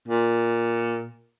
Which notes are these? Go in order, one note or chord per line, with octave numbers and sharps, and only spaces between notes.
A#2